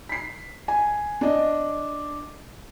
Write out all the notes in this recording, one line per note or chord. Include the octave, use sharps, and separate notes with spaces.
B6 C7
G#5
D4 D#5